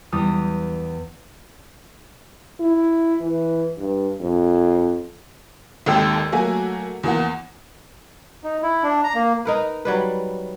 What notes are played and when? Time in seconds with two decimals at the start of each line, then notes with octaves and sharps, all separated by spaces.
0.12 E2 G3 D#6
2.60 E4
3.21 E3
3.78 G2
4.21 F2
5.86 G#1 D#2 A4 G5 E6
6.32 F#3 A3 A#3 F#4 G#5
7.03 E2 A#3 F#5
8.44 D#4
8.62 E4
8.83 D4
9.04 A#5
9.15 A#3
9.45 D#4 A#4 B4
9.85 F#3 G3 B4